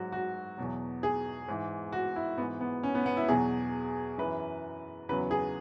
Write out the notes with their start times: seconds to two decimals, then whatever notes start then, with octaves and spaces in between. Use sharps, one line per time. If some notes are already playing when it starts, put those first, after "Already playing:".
Already playing: G#2 F#3 F#4
0.12 F#4
0.57 E2 B2 F#3
1.03 G#4
1.48 G#2 E3
1.92 F#4
2.16 E4
2.38 G#2 E3 B3
2.61 B3
2.83 C#4
2.95 B3
3.06 B3
3.17 E4
3.28 E2 B2 F#3 G#4
4.18 F#2 E3 B4
5.09 E2 C#3 F#3 B4
5.31 G#4